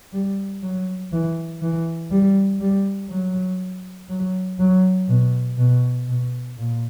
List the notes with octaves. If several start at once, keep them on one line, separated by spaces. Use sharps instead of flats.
G3
F#3
E3
E3
G3
G3
F#3
F#3
F#3
B2
B2
B2
A#2